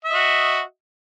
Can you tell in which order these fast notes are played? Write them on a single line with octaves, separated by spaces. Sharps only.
E5 D#5 F#4